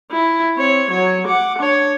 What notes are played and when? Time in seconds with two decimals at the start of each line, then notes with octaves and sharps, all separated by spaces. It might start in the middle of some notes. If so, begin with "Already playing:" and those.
0.11 E4
0.57 C4 C#5
0.90 F#3 C#5
1.27 F#5 D6
1.59 D4 C#5